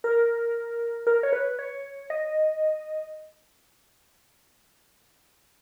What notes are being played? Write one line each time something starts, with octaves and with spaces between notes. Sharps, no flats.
A#4
A#4
C#5
B4
C#5
D#5